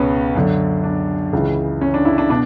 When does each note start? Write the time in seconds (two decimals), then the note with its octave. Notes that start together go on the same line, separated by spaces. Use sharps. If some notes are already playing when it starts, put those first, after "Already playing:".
Already playing: C#2 B2 B3 C#4
0.35 F#2 D3
0.84 D4
1.33 C#2 C#3 E3
1.81 C#4
1.94 D4
2.05 E4
2.18 D4
2.30 B2 D4